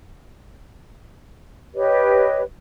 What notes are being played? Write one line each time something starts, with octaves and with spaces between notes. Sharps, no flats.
G4 B4 C#5 D#5